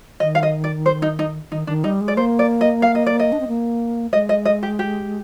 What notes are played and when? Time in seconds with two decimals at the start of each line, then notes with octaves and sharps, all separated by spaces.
0.20 D#3 D#5
0.35 F5
0.43 D#5
0.64 D5
0.86 C5
1.02 D#4
1.19 D#4
1.51 D#3 D#4
1.67 D#3 D4
1.84 G3 D#4
2.01 G#3
2.08 D5
2.17 A#3 C5
2.39 D5
2.61 D#5
2.82 F5
2.95 D#5
3.06 D5
3.20 D#5
3.32 D4
3.40 C4
3.48 A#3
4.13 G#3 D#5
4.29 D#5
4.45 D#5
4.63 G4
4.79 G4